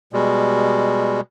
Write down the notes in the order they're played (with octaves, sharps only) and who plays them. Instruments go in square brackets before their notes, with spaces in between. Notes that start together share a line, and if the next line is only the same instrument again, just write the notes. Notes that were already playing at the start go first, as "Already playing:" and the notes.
[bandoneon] B2 G3 G#3